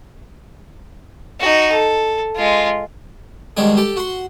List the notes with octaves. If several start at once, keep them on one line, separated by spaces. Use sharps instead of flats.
D#4 F#4
A4
G#3 F4
B2 D#3 G3 G#3 G#4
G4 A4
F#4 C6